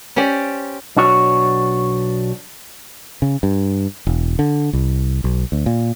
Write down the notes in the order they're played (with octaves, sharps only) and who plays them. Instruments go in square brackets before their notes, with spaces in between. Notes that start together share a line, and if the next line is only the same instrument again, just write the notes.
[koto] C#4 G4 C5 D5
[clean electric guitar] B1 D4 F#4 C#5
[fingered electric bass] C#3
G2
E1
D3
C2
B1
D2
A#2